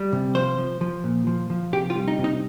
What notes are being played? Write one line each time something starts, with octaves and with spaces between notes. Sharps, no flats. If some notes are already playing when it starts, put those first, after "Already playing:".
Already playing: G3
C3
F3 C5
F3
F3
A#2
F3
F3
C3 G4
F4
G3
D#4
C3
D#4